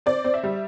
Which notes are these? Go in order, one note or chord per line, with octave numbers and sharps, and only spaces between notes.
C4 D5
C4
E5
G3